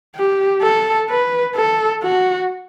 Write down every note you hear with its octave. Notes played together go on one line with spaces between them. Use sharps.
G4
A4
B4
A4
F#4